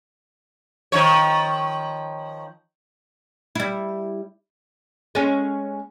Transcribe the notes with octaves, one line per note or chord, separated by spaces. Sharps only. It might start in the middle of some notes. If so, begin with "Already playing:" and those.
D#3 F3 C#5
G3 E4
G#3 C#4